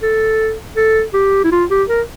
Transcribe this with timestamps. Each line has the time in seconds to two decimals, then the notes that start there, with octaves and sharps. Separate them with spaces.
0.02 A4
0.77 A4
1.14 G4
1.44 E4
1.52 F4
1.70 G4
1.89 A#4